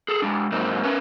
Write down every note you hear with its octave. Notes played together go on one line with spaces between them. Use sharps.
G#4 A4
G#3 D4
G#2 F#3 A#3 C4 D#4
C#4 A#4 B4